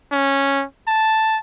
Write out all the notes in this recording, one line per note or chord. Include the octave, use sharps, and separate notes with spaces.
C#4
A5